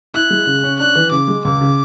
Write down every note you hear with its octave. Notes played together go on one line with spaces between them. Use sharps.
E4 F#6
G#3
C#3
C#4
D4 F#6
E3
C#3 D6
G#3
C#2 D6
C#3